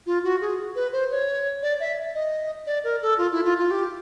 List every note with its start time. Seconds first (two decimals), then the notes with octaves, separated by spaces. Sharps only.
0.06 F4
0.24 F#4
0.41 G#4
0.76 B4
0.93 C5
1.11 C#5
1.62 D5
1.80 E5
2.15 D#5
2.67 D5
2.84 A#4
3.02 A4
3.18 F4
3.32 E4
3.45 F4
3.58 F4
3.71 G4